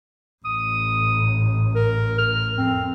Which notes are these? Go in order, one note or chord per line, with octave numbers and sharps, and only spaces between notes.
A1 D#6
A#4
F6
F2 C4